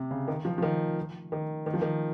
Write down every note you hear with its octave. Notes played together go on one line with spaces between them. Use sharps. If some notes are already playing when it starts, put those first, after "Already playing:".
Already playing: C3
C#3
D#3
F3
F3
D#3
D#3
D#3
F3
D#3